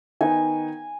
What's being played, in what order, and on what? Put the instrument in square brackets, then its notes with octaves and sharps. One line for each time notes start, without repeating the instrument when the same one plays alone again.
[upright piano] D#3 B3 D#4 [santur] G#5